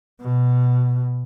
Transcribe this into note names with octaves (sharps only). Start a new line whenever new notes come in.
B2